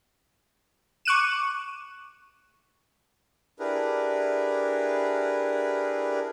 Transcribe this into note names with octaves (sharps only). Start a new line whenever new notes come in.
C#6 D6 F#6 D#7 E7
D4 E4 G4 G#4 A#4 B4